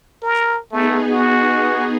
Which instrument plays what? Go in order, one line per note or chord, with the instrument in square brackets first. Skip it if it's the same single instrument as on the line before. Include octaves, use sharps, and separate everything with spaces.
[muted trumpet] A#4
[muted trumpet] A3 [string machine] B3 D#4 G#4
[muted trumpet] F#4